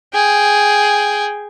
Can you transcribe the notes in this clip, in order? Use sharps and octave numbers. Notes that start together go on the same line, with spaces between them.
G#4 G5